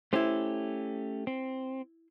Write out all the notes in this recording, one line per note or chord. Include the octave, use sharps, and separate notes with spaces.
A3 C#4 E4 G4 C5
C4